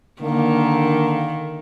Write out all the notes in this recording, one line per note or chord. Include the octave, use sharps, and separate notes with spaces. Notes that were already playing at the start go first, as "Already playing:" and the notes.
D3 D#3 A#3